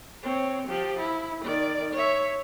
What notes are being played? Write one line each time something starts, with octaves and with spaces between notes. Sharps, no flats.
C4 C#5
F3 G4
E4
D#3 D5
C#5 E5